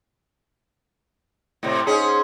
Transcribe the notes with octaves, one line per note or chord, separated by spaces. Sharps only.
A2 C3
G#2 C#4 G#4